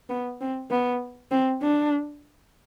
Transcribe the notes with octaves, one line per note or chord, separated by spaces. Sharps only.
B3
C4
B3
C4
D4